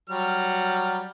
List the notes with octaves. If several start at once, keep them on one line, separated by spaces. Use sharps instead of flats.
F#3 G3 F6